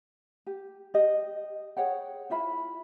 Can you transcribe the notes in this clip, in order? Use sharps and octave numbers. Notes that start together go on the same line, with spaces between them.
G4
G4 D#5
G#4 C#5 F#5 G5
E4 F4 E5 B5